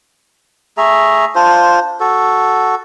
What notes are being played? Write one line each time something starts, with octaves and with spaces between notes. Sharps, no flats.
A3 G#4 E5 A#5
D4 F4 C5
F#4 A4